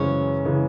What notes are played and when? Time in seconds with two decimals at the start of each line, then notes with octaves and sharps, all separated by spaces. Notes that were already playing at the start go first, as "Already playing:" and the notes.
Already playing: F#2 C#3 E3 G#3 C#4
0.45 C#3 E3 G#3